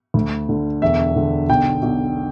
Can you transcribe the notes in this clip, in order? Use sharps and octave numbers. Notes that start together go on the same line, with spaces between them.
D2
D3
E1 E5
D3
B1 G5
B1